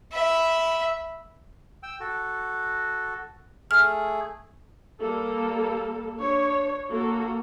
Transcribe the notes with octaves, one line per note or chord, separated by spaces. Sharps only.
E5 B5
G5 E6
F#4 A4
A3 G#4 F6
G3 A#3 A4
D4 C#5
A#3 F#4 A4